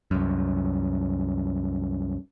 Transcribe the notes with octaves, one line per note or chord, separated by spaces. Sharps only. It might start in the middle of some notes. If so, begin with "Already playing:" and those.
C2 F#2